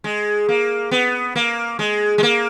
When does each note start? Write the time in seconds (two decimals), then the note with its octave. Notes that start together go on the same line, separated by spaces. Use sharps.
0.04 G#3
0.49 A#3
0.91 B3
1.36 A#3
1.79 G#3
2.18 G#3
2.23 A#3